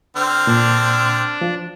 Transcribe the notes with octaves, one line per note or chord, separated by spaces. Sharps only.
D3 C4 F6
A#2 D4
F3